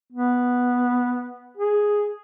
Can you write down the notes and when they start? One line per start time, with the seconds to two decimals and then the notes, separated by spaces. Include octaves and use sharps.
0.12 B3
1.57 G#4